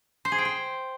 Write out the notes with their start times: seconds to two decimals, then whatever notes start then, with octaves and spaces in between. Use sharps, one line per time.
0.25 C5
0.32 G#4
0.38 G5
0.45 C5